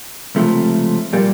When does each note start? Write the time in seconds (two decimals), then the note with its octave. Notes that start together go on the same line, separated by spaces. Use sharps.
0.35 C#2 C3 F3 A3
1.13 A#2 G3 A#3